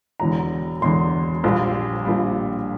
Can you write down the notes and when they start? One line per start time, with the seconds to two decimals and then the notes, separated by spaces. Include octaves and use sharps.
0.20 E1 E2 D3 A#5
0.81 E1 E2 D3 C6
1.44 A#1 A#2 G3
2.05 A#1 A#2 G3